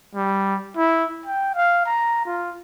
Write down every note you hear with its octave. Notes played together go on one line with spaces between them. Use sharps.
G3
E4
G5
F5
A#5
F4